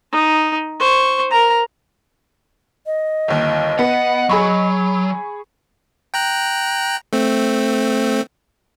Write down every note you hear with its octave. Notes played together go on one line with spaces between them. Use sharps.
D#4
C5 C#6
A#4 A#5
D#5
G1 D#2
B3 B4 F#5
F#3 G#4 B5 C#6
G5 A#5 F#6
A3 C4